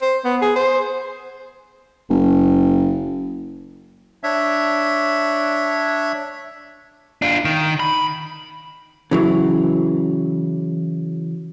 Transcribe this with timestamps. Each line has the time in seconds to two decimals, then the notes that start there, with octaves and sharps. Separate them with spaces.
0.02 C5
0.25 B3
0.42 G#4
0.56 C5
2.10 F#1
4.23 D4 C#5 E5
7.22 D4 F4
7.45 D#3
7.80 B5
9.11 C#3 E3 F#3